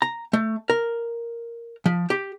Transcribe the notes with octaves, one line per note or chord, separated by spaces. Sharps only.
A#5
A3
A#4
F3
G4